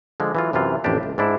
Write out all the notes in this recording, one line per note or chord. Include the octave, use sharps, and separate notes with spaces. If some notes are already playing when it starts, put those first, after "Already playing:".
D3 F3 G#3
E3 F#3 F4
F#2 C3 E3 F4
A1 F2 A2 A#3 D4 G4
C#2
G#2 D4 E4